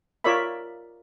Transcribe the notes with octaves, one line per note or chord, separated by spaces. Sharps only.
F4 A#4 C#5 D5 E5 B5